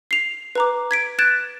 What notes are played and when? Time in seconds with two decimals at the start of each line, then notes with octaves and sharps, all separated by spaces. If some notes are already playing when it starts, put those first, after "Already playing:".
0.11 C7 F7
0.55 B4 A#5 D6
0.91 G#6 B6 D7
1.19 F#6 G#6 A6 D7 E7